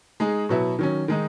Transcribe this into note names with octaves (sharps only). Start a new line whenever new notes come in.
G#3 D#4 G#4
B2 F#3 B3 E4
D#3 F#3 C#4
D#3 G#3 D#4